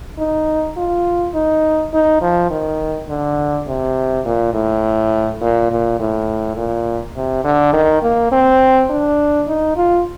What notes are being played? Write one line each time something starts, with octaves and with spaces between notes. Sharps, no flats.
D#4
F4
D#4
D#4
F3
D#3
D3
C3
A#2
A2
A#2
A#2
A2
A#2
C3
D3
D#3
A#3
C4
D4
D#4
F4